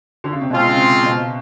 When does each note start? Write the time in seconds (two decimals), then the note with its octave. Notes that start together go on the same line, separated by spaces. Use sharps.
0.24 D3
0.33 C#3
0.41 C3
0.50 B2 G#3 C4 F4
0.67 C#3
0.77 C3
1.03 B2